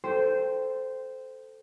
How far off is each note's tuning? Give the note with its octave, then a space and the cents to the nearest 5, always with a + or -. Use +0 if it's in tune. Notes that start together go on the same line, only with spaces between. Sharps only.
A4 +0 C5 -10 G5 +0